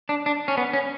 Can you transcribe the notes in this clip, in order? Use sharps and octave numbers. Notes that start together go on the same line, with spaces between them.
D4
D4
C#4
B3
C#4